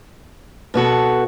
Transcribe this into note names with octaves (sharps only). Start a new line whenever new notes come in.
B2 B3 F#4 A4